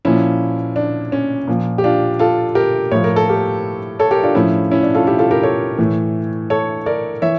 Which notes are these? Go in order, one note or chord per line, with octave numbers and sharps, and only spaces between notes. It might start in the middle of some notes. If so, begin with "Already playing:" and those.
A#2 F3 C#4 E4
D4
C#4
A#2 F3
G4
D4 F4
F4 A4
G4 A#4
A2 F3 C#5
A#4
A4
G4 A#4
A4 C#5
G4 A#4
D4 F4
A2 F3 C#4 E4
C#4 E4
D4
F4 A4
E4 G4
F4 A4
G4 A#4
A4 C#5
A2 E3
A4 C#5
A#4 D5
E3 C#5 E5